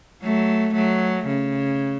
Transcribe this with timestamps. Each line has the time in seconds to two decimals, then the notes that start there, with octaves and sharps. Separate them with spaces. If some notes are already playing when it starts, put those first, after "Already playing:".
0.23 F#3 A3
0.74 F#3 A3
1.26 C#3